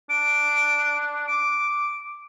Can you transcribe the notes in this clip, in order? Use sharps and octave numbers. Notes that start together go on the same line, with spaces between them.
D4 D7
D6 D7